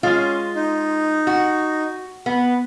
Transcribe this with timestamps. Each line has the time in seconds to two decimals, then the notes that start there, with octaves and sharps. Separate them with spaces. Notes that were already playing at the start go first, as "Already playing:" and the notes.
0.03 G#3 C#4 F4
0.56 D#4
1.27 F#4
2.26 B3